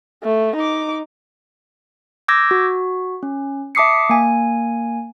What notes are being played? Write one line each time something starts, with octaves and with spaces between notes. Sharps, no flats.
A3
D#4 D6
D6 E6 G6 G#6 A#6
F#4
C#4
E5 A5 D6 D#6 C7 C#7
A#3 G#5